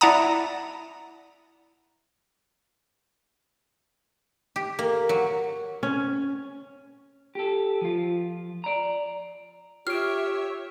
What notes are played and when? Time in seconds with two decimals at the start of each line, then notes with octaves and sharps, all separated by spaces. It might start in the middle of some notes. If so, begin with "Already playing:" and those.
0.01 E4 D5 F#5 A5 A#5 D#6
4.56 G4
4.79 A#3
5.09 F#3
5.83 C#4
7.35 G4 A4
7.81 F3 F4
8.64 D5 A#5
9.87 F4 G4 C#5 E5 F6 D7